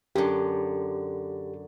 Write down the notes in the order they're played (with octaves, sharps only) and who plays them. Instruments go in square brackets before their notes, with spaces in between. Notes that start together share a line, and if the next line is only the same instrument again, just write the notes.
[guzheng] F#2 D3 [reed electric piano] G4